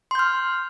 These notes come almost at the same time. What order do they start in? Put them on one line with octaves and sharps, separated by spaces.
C6 G6 F6